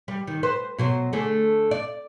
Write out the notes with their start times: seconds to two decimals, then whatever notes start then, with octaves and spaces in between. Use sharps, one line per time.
0.08 G3
0.27 D#3
0.43 B4 C5
0.78 B2 F#3 C5
1.13 D3 A3 G#4
1.71 D5